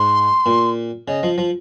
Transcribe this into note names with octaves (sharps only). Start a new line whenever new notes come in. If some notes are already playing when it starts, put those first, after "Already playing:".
Already playing: G#2 C6
A#2
C#3 D#5
F3
F3